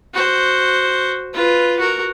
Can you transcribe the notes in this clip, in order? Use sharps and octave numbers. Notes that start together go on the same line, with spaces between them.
F#4 C5
F4 B4
F#4 A#4